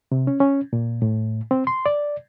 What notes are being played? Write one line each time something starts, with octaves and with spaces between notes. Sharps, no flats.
C3
C#4
C#4
A#2
A2
C4
C6
D5